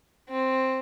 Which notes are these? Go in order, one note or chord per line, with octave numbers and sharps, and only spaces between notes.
C4